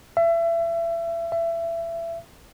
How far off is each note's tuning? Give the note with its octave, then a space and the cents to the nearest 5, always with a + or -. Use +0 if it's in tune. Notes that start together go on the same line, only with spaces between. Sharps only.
E5 +30
E5 +25